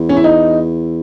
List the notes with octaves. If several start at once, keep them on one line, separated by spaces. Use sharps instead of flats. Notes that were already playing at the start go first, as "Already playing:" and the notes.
Already playing: E2
C#4
E4
D#4